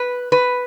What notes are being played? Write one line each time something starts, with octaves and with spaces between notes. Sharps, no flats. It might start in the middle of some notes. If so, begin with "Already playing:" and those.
Already playing: B4
B4